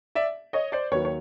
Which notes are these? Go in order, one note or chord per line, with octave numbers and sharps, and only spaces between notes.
D5 E5
C#5 D#5
C5 D5
D#2 D#3 F#3 B4 C#5
C#5